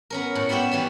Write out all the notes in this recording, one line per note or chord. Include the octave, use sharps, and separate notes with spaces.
B3 C#4 A#4
A2
G3 B3 F#4 G4 E5
E3 G3 C#4